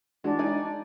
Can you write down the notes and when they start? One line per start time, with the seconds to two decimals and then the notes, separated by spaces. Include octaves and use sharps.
0.24 E3 G#3 D4 F#4
0.39 D#4 D5 G#5